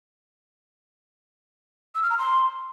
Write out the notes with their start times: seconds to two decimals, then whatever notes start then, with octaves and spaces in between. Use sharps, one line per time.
1.95 E6
2.03 F6
2.10 A#5
2.18 C6